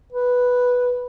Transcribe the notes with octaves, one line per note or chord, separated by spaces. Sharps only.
B4